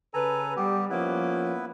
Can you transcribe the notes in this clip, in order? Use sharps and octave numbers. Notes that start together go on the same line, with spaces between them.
C#3 A4 B4 G#5 A#5
G3 B3 G4
F3 A#3 B3 C#4 E4 B4